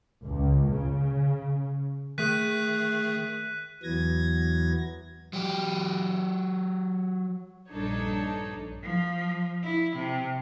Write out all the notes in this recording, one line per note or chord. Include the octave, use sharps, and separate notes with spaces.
C#2
C#3
D#3 A3 G#4 F#6 B6 D#7
E2 E3 F#3 B3 G#6 A#6
F#3 G4
A#1 G2 D4 D#4 A4 C#5
F3
E4
C3